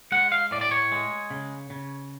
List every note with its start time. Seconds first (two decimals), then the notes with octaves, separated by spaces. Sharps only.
0.12 G#3 F#5
0.32 F5
0.51 A2 D5
0.61 D5
0.71 C#5
0.92 G#3
1.31 C#3
1.70 C#3